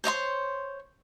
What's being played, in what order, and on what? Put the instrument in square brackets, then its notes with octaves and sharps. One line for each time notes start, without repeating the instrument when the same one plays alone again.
[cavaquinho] C5 C#5 D#5 C6